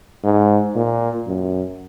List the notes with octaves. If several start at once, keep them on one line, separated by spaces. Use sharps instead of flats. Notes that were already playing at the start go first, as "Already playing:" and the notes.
G#2
A#2
F#2